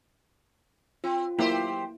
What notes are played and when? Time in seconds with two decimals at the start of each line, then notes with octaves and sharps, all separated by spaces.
1.04 C4 F4
1.39 F#3 A#3 E4 G4 C5